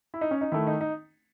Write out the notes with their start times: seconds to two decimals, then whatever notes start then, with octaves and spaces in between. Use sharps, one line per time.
0.14 E4
0.21 D#4
0.31 C#4
0.41 D#4
0.52 D#3 A3 E4
0.67 D#4
0.81 D#4